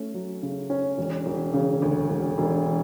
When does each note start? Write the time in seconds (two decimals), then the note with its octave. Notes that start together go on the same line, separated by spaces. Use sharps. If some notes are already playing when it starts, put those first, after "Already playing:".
Already playing: A3 C#4
0.14 F#3
0.43 C#3
0.70 C#4
0.97 E1
1.26 E1
1.54 C#3
1.82 D2
2.10 E1
2.38 E1